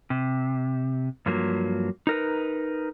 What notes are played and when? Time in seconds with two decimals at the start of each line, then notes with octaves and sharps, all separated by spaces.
0.10 C3
1.26 G2 F3 F#3 A#3
2.07 D#4 A#4 B4